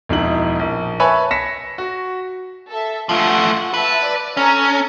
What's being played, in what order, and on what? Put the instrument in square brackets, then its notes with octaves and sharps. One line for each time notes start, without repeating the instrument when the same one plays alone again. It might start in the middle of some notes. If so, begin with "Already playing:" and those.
[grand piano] E1 F2 D#4 E4 F#7
A#1
B4 C#5 E5 G#5 A5 B5
A#6 B6 C#7 E7
F#4
[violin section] A4 E5
[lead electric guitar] F3 A3 [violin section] F4 F#5
[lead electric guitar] B4 [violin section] E5 A5
[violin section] D5
[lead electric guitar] C#4 [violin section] A4 A#5